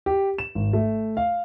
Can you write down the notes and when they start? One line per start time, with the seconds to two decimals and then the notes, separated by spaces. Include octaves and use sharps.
0.06 G4
0.38 E7
0.55 G#1
0.73 A3
1.17 F5